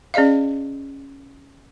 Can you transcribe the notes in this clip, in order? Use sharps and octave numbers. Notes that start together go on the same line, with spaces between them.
C#4 G#4 D5 D#5 F5